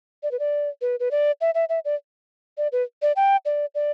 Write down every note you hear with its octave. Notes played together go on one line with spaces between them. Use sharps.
D5
B4
D5
B4
B4
D5
E5
E5
E5
D5
D5
B4
D5
G5
D5
D5